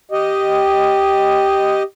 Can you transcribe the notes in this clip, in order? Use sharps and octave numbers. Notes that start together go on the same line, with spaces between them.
G4 D#5